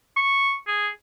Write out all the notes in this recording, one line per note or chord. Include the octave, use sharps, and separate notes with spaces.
C#6
G#4